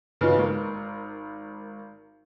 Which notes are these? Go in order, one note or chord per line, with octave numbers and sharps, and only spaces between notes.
C#3 E3 B3 D#4 F4 F#4
G#1 A#4